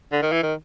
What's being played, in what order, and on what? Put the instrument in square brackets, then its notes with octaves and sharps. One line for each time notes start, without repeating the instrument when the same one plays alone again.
[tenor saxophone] D3
D#3
E3
D#3